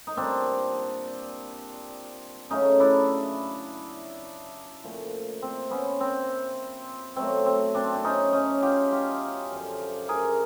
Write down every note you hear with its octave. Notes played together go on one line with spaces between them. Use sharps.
D#4
A#2 G3 C4 D4
C#3 F#3 A3 C#4 D#4
D4 E4
A#2 F3 A3
C4
B3 C#4
C4
B2 F#3 A3 C4
C4
C4 D4
D4
C#4 D#4
C#4 D#4
F4 G4
F4 G4
F#2 D3 F3
G#4 A#4